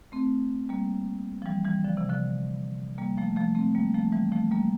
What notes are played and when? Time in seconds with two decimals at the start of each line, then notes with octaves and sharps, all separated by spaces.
0.12 A3 C4
0.69 G3 A#3
1.42 F3
1.46 E3 G3
1.65 E3 G3
1.84 D3 F3
1.97 C3 E3
2.09 D3 F3
2.98 G3 A#3
3.17 F3 A3
3.36 F3 A3
3.55 A3 C4
3.75 G3 A#3
3.94 F3 A3
4.12 E3 G3
4.32 F3 A3
4.51 G3 A#3